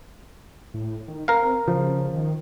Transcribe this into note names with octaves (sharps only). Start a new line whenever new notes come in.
A2
D#3
C4 A#4 F5
C#3 F3
D#3